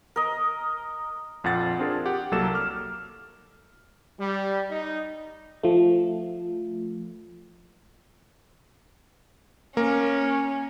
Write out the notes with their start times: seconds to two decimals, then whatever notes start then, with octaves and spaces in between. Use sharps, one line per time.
0.16 A#4 D#5
1.44 A#1 F2 F4 F#5 A6
1.79 C4 D4 F4 G#4 A#4
2.06 G4 F#5
2.31 C2 F#3 A#3 A4 E7
2.54 D6 F6
4.19 G3
4.69 D#4
5.63 F3 A3
9.77 A#3 C#4 A#4